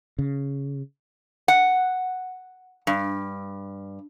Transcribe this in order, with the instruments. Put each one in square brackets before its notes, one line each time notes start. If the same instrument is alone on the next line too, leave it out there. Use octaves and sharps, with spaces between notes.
[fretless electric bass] C#3
[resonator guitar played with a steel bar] F#5
G2